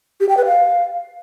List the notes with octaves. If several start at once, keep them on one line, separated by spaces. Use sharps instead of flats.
G4
G5
B4
F5